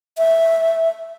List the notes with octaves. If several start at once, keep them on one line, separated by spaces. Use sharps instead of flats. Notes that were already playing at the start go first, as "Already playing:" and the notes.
E5